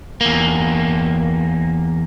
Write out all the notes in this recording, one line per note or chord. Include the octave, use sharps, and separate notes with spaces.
E2 A#3